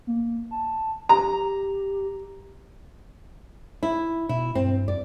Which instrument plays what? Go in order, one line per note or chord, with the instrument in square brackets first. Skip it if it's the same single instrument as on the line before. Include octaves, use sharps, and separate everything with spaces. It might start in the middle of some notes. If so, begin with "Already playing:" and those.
[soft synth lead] A#3
A5
[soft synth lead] G4 [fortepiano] A#5
[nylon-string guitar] E4
[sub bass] B2 [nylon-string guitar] E4
[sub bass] G2 [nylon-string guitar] C4
[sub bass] F#2 [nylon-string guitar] D5